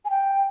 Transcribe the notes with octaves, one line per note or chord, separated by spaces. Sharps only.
G#5
G5